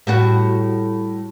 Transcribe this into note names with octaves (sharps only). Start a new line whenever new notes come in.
A2 G3 F#4